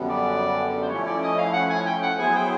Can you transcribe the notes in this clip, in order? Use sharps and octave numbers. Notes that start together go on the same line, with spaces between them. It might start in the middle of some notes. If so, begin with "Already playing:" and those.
Already playing: F#2 D3 G3 B3
D5
C5
F3 A3 C#4 E4 C#5
D5
D#5
F5
F#5
G#5
G5
F#5
F#3 B3 E4 G#4 C5 G#5
G5